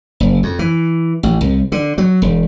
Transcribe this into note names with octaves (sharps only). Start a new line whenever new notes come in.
F#1
F2
E3
A1
C2
D3
F#3
E1